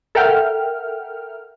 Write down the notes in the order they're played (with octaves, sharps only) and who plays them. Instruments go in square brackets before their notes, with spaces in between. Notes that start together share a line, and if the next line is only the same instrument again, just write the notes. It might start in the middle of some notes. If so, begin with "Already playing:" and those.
[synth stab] A4 A#4 E5 F#5 G5 F6